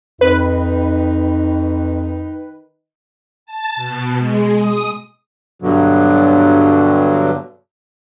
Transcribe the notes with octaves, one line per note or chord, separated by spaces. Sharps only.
F2 D#3 D#4 B4
A5
B2
G#3
D#6
G2 B2 D3 F#3